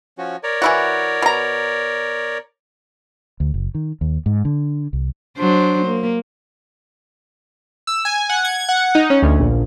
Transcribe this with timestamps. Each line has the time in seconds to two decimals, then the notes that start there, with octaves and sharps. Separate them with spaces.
0.18 F3 C#4 F#4
0.43 A#4 C#5 D5
0.62 E3 E4 F#4
1.22 B2 A#5
3.40 D2
3.54 F#1
3.75 D#3
4.01 D#2
4.26 G#2
4.45 D3
4.93 C2
5.38 F#3 D4 C5
5.87 A#3
7.87 E6
8.05 G#5
8.29 F#5
8.45 G#6
8.69 F#5
8.95 D#4
9.10 C#4
9.22 D2
9.40 A#1